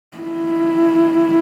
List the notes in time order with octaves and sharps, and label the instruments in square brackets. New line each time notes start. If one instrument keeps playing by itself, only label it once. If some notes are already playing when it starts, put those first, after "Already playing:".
[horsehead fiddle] E4